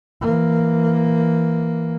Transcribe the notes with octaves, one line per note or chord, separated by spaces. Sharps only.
E3 A#3